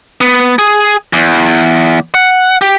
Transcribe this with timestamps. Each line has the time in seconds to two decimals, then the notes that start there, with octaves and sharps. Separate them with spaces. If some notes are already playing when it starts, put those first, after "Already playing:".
0.21 B3
0.59 G#4
1.13 E2
2.15 F#5
2.62 G4